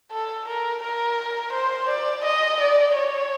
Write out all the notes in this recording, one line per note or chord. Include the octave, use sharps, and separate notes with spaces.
A4
A#4
A#4
C5
D5
D#5
D5
C#5